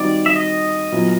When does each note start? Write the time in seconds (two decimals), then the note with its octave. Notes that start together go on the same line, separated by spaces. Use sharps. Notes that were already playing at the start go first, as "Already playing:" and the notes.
Already playing: D#3 G3 C4 D#4 F#4 D5
0.26 E5
0.36 D#5
0.92 A#2 F#3 B3 E4